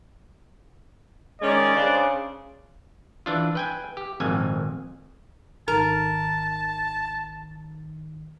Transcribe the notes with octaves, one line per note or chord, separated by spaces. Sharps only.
D#3 G#3 C#4 D5
C#3 D4 C5
E3 D4 F4
B4 G5 G#5
G4
G#1 F2 A#2 G#5
G#1 D#3 A#4 A5